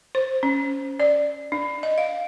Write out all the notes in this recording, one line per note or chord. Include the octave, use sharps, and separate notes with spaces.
C5
C#4
D5
D4
D#5
F5